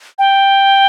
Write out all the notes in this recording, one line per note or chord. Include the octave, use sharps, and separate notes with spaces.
G5